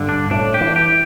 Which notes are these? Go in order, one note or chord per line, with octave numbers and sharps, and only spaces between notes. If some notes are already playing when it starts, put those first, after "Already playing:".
Already playing: G2 D3
D4
A2 D4
G4
E3
G4